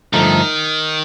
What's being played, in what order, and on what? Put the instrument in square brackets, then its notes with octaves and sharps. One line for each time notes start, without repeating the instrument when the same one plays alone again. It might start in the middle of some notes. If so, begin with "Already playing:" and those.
[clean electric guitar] G2 D3 F3 A3 D#4 [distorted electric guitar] D#3